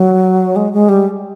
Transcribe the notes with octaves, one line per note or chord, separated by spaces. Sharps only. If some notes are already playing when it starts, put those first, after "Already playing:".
Already playing: F#3
G#3
G#3
G3